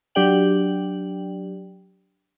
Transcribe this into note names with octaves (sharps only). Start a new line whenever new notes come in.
F#3 D4 G4 D5 G5 F#7